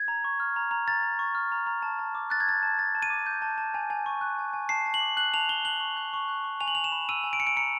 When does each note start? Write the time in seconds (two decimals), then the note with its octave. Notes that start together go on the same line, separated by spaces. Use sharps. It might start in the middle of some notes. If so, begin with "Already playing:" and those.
Already playing: G#6
0.08 A#5
0.24 C#6
0.40 F6
0.56 A#5
0.71 A#5
0.88 A#5 A6
1.03 A#5
1.19 C#6
1.35 F6
1.52 A#5
1.67 A#5
1.82 A5
1.99 A5
2.15 D6
2.30 F#6 A6
2.40 G#6
2.47 A5 A6
2.63 A5
2.79 A5 A6
2.95 A5
3.02 D#7
3.10 D6
3.26 G6
3.42 A5
3.58 A5
3.74 G#5
3.90 G#5
4.06 C#6
4.21 F#6
4.38 G#5
4.53 G#5
4.69 A5 C7
4.86 A5
4.94 F#7
5.01 D6
5.17 F#6 F#7
5.34 A5 F7
5.49 A5 G7
5.65 F#6 F#7
5.81 C#6
5.97 F#6
6.14 C#6
6.28 F#6
6.44 C#6
6.61 G#5 F7
6.68 F#7
6.75 G#5 F7
6.84 E7
6.92 B5
7.09 E6 D#7
7.24 G#5
7.33 D7
7.40 G#5 C#7
7.47 D7
7.56 A#5 C#7